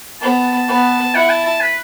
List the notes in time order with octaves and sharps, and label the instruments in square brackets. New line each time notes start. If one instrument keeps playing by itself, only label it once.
[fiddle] B3 [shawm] A5
[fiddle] B3
[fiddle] E4 [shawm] F#5
[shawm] A5
A5
B4